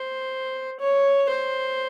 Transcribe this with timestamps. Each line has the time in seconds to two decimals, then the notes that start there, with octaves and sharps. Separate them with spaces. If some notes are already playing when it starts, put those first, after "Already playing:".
Already playing: C5
0.79 C#5
1.29 C5